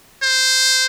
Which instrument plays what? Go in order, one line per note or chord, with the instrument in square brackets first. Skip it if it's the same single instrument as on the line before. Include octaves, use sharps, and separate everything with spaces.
[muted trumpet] C5